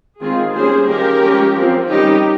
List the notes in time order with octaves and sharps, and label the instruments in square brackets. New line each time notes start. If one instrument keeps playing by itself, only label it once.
[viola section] D#3 G#3 C4 F4 G#4
G3 A#3 C#4 G#4 C5
D#3 A#3 C#4 G4 A#4
F3 G#3 C#4
F3 C4
D#3 G3 C#4 D#4 G4